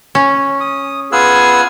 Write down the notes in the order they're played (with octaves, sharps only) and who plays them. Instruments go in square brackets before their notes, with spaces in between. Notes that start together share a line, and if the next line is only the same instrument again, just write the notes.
[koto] C#4
[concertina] D#6
[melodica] B3 E6 [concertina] F4 F#6 [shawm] G#4